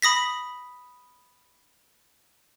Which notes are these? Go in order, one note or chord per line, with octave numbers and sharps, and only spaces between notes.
B5 D#6 A#6 B6